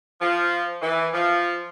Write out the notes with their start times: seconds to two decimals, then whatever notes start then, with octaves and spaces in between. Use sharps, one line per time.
0.21 F3
0.82 E3
1.13 F3